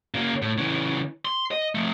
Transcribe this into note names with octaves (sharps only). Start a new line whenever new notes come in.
C#3 A#3
A2
C#3 E3
C6
D#5
F3 A3